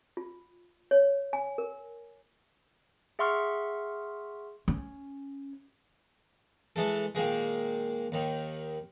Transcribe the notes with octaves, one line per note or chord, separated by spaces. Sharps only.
F4
C#5
G#5
A#4
G#4 E5 F#5 C6 C#6 F6
C#4
E3 G#3 A4
A#2 D#3 G#3
D#2 D#3